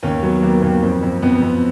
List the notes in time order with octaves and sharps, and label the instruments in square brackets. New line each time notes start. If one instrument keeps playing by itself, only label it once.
[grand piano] D#2 C#4
F#3 B3
D#2 A#3
D#2
F2
F2
F2 B3
F2